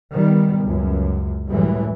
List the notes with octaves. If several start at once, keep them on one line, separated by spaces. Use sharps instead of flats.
D#3 G3 B3
C#2 F#2
F#2 A2 E3 G3 G#3